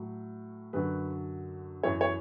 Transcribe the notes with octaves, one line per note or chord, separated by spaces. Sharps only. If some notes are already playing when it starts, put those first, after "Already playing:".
Already playing: A2 F#3
F#2 D3 F#3 B4
F#2 E3 C#5
C#5